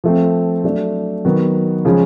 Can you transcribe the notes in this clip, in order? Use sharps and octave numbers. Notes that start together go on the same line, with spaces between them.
F3 A3 C4
F#3 A3 D4
D#3 F#3 B3
C#3 F3 G#3 C#4